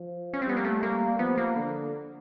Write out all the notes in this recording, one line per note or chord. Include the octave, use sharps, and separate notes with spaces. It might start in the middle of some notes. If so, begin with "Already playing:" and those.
Already playing: F3
C#4
C4
G3 B3
A#3
A3
A#3
F3 B3
A#3
D3